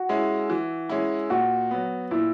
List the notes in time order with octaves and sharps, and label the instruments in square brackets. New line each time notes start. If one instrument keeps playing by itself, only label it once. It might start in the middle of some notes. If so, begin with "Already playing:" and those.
Already playing: [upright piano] F#4
[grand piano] G#3 C#4 E4
E3
G#3 C#4 E4
[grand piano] A#2 [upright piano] F#4
[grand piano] F#3 B3
[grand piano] A#2 [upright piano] E4